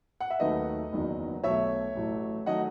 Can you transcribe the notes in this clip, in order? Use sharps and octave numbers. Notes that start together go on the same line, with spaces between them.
F#5
E5
D#2 D#3 F#3 A3 B4 D#5
F#1 E2 D#3 F#3
B1 B2 A3 C#5 E5
A1 A2 F#3 A3
D#3 F#3 A3 D#5 F#5